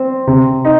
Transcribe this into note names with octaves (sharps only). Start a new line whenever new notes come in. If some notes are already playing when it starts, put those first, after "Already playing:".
Already playing: C4
C3
D#4